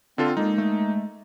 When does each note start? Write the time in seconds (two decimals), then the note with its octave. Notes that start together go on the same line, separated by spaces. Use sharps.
0.18 D3 C4 F4 A4
0.37 G#3 A#3 D#4
0.58 A3